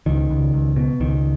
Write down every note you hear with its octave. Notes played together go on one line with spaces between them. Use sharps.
C#2 D#3
C#2
C#2
B2
C#2 D#3